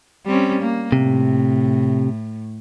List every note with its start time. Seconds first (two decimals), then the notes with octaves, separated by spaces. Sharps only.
0.26 G3 C4 C#4
0.62 A#3
0.92 A2 C3